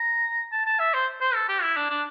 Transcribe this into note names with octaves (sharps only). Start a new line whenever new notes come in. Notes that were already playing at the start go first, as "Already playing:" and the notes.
Already playing: A#5
A5
A5
E5
C5
C5
A4
G4
E4
D4
D4